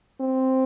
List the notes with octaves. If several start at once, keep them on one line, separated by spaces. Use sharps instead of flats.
C4